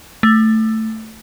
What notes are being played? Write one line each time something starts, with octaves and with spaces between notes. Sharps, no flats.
A3